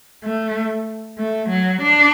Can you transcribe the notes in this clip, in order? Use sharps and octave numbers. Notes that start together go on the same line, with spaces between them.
A3
A3
F#3
D4